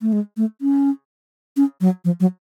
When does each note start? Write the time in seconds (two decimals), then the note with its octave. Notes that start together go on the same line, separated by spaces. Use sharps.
0.02 A3
0.13 G#3
0.37 A3
0.61 C#4
1.57 C#4
1.81 F#3
2.05 F3
2.20 F#3